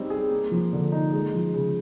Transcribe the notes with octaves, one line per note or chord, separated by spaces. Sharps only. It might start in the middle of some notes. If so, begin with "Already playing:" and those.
Already playing: G3 C4 C#4 D#4
G#4
A#3
F3
D3
D#4
G#3
F3
C#3